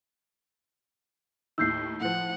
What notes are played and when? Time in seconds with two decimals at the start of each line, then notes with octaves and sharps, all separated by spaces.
1.58 D#2 A2 D#3 E6 G6 C7
2.01 A2 F3 F#5